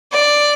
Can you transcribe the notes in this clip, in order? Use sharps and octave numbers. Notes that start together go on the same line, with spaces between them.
D5